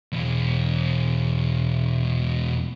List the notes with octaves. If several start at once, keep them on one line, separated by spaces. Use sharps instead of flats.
E2 B2